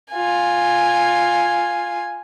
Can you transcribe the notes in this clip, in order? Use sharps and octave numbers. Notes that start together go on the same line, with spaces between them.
F4 G#5